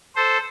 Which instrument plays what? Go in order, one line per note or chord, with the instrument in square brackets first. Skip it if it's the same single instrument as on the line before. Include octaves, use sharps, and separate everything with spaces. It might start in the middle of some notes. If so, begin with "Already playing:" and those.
[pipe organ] A4 C5